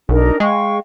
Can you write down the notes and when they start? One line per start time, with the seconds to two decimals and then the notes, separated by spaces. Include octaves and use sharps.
0.09 B1 D4 D#4 A#4
0.40 G#3 F5 G5 C#6